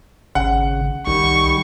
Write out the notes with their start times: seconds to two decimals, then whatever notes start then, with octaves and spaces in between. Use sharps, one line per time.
0.35 G#1 C#3 F#5
1.07 C2 D#3 G3 C#6